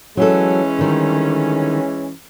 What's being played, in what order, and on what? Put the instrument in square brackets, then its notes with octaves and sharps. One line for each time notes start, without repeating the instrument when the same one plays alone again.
[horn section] E3 G#3 C#4 [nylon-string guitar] F#3 A4
[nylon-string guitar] D3 D#3 G3